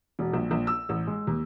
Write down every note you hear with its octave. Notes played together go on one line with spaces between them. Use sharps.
E1
A#1
A#1
E6
A1
G#3
D#2